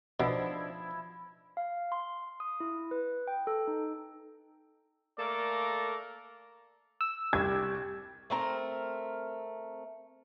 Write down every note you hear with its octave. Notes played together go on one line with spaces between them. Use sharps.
B2 F3 D4 E4 D#5 E5
F5
C6
D#6
E4
B4
G5
A4
D#4
A3 A#3 A4 A#4 D5
E6
C2 G4 G#6
A3 C4 A#4